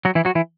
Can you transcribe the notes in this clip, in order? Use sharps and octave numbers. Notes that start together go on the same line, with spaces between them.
F#3 F#4
E3 E4
F#3 F#4
E3 E4